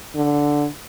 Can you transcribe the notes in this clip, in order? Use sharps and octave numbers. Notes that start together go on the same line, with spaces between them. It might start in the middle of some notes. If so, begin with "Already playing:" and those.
D3